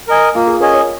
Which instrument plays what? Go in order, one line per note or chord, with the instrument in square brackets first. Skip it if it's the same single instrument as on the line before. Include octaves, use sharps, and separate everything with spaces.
[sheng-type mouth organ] A#4 D#5 G#5
[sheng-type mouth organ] A#3 [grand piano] F4
[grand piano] G#4
[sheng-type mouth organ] C#4 G#4 D#5 G#5 [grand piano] A#4
[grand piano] C#5